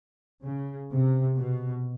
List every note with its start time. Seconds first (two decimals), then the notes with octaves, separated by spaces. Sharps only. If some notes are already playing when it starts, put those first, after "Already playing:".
0.43 C#3
0.91 C3
1.37 B2